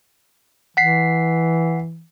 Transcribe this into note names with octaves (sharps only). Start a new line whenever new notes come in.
E3 F#5 B6 C7